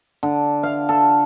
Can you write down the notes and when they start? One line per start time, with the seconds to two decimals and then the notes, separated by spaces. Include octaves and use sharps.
0.23 D3
0.63 F5
0.89 A4